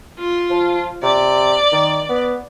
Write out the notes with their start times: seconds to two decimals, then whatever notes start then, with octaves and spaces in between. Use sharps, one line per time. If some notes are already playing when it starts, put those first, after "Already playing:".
0.18 F4
0.50 F3
1.03 C3 D5
1.72 D#3
2.09 B3